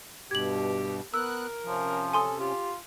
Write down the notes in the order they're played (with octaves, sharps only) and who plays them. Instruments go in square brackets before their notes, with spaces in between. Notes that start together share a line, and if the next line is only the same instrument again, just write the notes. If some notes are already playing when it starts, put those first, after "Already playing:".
[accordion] G2 B2 [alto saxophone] G4 [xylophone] G#6 F#7
[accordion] B3 F#6 [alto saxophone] A#4 [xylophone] E6
[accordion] C3 C#4 [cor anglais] F3
[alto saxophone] A4 [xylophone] G#5 C6 D#6
[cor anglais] F4 [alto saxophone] G4